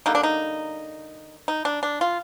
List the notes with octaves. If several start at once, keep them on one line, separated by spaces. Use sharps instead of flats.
D3 G3 A#3 D#4
D4
D#4
D#4
D4
D4
F4